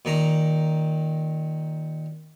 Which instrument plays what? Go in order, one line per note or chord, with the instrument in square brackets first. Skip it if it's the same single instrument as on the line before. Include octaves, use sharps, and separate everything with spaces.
[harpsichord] A#2 D#3 A#5